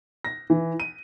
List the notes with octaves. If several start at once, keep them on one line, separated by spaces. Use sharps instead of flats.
A#6
E3
D#7